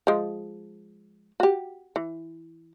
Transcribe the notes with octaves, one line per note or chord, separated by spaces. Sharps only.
F3 G#3
F#4 G4
E3